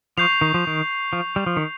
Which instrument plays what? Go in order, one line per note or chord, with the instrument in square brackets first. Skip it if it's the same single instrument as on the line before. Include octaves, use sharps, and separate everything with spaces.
[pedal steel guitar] F3 [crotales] C#6 G6 C7 F7
[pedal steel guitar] D#3
F3
D#3
F3
G3
F3
D#3